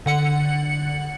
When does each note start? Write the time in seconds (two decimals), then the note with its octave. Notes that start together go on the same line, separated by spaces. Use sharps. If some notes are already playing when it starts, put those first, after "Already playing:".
0.06 D3 F#5 C#7